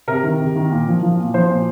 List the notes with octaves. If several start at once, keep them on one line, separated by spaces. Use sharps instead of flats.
C3 A#4
D#3
C3
D#3
A#2
F3
F3
A#2
F3 C5
A#2